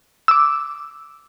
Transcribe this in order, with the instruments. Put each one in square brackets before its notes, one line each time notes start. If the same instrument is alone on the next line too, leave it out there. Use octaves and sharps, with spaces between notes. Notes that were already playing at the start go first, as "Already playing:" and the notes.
[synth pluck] D6 E6